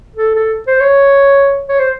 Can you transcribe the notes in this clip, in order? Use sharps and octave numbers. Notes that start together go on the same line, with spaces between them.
A4
A4
C5
C#5
C#5
C5